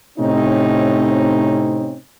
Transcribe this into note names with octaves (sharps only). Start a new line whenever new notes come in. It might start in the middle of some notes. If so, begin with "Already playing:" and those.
A2 C3 C4 C#4 D#4